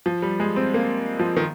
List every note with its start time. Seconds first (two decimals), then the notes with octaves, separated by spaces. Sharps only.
0.06 F3
0.22 G3
0.40 G#3
0.56 C4
0.74 A#3
1.20 F3
1.37 D#3